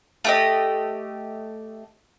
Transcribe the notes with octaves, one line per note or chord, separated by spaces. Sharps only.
A3 G4 D#5